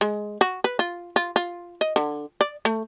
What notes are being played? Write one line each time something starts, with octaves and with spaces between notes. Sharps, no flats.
G#3
F#4
B4
F4
F4
F4
D#5
D3
D5
A3